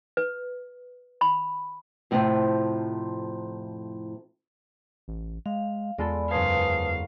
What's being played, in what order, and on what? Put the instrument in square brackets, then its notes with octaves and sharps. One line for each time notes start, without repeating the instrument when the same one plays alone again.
[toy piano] B4
B5
[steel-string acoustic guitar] F2 A2 C3 E3 F3
[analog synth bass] A1
[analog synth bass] G#3 [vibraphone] F5
[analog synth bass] E2 [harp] G#3 F4 A4 [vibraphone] D5 B5
[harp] F#1 C5 G#6 [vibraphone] B4 A5 D#6 [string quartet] F5